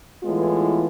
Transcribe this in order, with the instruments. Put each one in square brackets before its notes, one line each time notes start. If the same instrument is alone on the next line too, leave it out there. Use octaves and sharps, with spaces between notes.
[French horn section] A2 E3 G#3 B3 F4